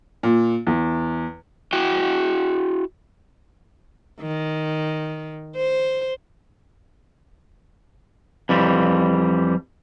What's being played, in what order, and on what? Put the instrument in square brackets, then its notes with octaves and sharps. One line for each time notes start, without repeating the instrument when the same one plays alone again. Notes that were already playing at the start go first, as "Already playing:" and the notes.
[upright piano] A#2
E2
[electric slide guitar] E4 F#4 G5
[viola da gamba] D#3
C5
[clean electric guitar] F2 E3 G3